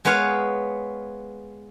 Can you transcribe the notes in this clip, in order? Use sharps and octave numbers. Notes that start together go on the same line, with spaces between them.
G#3 B3 B4 C#5 F5